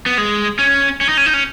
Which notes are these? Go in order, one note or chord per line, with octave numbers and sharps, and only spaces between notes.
B3
G#3
C#4
C#4
D#4
C#4
D#4
C#4